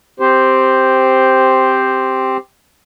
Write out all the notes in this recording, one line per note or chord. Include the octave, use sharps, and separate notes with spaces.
C4 G4 C5